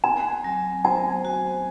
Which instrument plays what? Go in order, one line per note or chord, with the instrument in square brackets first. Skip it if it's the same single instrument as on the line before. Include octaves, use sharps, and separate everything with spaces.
[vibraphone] C4 [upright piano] G#5
[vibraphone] F#3
[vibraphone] C5 [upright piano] G#5
[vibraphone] F#4